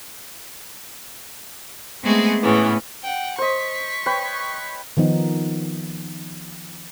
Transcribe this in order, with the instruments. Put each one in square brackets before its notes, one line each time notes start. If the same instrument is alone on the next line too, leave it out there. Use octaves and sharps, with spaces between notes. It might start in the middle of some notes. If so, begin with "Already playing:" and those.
[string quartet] G#3 A3 B3 C4 F#4 G#4
A2 C#3 E3 B3
[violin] F#5 G5
[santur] C5 D#5 [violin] C#6 B6
[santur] B4 C#5 G5
[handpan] D#3 F3 B3 D#4